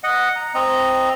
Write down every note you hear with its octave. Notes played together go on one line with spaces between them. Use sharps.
D#5 F#5
A#5
C4 D#5 A#5